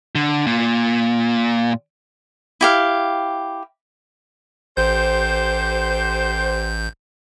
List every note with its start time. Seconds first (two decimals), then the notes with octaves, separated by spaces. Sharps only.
0.15 D3
0.47 A#2
2.61 E4 G4 F5
4.77 A1 G4 A4 C5 G6